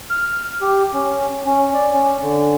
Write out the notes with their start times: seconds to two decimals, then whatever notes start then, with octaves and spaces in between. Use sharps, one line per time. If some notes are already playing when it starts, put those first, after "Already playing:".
0.10 F6
0.61 G4
0.94 C#4
1.46 C#4
1.74 D5
1.94 C#4
2.23 D3